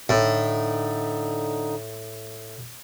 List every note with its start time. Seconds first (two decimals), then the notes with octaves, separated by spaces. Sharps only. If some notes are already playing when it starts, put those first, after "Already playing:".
0.09 A2 D3 D#4